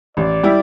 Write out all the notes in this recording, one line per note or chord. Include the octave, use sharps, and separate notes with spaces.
A1 D5
G3 E4 G4